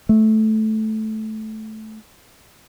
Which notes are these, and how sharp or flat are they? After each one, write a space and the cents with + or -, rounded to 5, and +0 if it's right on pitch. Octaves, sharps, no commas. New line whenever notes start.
A3 -15